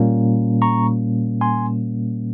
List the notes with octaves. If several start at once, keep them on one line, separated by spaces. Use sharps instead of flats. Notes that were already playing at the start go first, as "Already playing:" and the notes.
Already playing: A#2 G3 A#3 C#4
A#5 C#6
G#5 C6